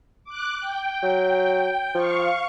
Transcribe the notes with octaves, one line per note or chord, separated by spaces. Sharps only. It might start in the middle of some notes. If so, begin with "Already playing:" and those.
D6 F#6
G5
F#3
F3 F5 C#6